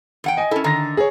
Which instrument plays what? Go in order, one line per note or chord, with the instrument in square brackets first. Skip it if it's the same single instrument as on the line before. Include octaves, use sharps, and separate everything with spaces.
[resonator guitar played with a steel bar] E2 F#5 G5
[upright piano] D#5 G#5
[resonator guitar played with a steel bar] C#4 E4 [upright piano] A4
[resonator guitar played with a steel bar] D3 D#3 [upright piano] A#5 A#6
[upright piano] G#4 C#5